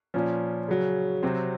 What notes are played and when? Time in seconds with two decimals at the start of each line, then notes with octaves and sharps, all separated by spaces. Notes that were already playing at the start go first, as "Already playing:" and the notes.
0.14 A#2 F3 C#4
0.68 C#3 F#3
1.23 C3 F#3 C4